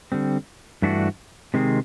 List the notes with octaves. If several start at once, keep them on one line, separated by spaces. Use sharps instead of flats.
D3 G3 C4
G2 E3 A3 D4 F#4
C3 D#3 G#3 C4